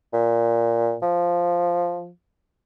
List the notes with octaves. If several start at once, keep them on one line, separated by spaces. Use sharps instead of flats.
A#2
F3